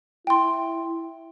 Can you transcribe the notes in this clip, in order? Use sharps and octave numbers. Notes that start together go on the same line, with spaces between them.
E4 G5 C6